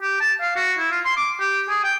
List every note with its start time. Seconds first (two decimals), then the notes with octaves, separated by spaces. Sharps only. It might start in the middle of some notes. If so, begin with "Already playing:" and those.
0.02 G4
0.21 A5
0.41 F5
0.56 F#4
0.78 E4
0.91 F4
1.05 C6
1.17 D6
1.40 G4
1.69 G#4
1.84 G5